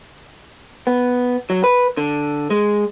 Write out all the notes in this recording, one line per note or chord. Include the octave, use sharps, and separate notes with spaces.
B3
F#3
B4
D3
G#3